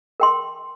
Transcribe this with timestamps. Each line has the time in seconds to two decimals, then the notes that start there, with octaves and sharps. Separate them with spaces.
0.20 A#4 G5 C6